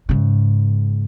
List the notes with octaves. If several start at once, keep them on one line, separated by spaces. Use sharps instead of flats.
G#2 C#3